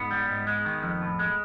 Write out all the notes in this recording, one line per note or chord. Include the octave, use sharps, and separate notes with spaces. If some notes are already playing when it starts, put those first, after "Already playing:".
Already playing: G#2 B3
G3
G#2
G#3
D#3
F2
A2
G#3